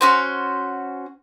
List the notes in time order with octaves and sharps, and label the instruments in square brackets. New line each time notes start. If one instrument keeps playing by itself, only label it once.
[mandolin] C#4 F#4 C5